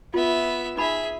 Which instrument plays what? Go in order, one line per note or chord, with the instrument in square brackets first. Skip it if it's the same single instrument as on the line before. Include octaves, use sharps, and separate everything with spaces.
[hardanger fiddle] B3 E5 [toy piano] F4
[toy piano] D#4 B5 [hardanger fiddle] G#4 E5